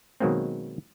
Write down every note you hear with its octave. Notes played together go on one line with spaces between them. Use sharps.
B2 D#3 F#3 G#3 A#3 C4